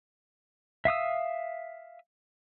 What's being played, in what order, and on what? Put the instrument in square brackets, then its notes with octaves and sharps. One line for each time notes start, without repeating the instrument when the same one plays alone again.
[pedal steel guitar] E5 F5 D#6 E6